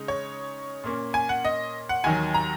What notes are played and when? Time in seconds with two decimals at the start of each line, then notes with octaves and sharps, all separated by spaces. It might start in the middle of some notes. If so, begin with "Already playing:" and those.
Already playing: C#3 G#3 D#4
0.08 C#5
0.84 A#2 A#3 C#4
1.14 G#5
1.29 F#5
1.45 D#5
1.89 F#5
2.04 D#2 D#3 F#3 G#5
2.34 A#5